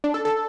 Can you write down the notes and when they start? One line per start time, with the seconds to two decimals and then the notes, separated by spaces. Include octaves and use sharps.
0.04 D4
0.14 A4
0.25 A4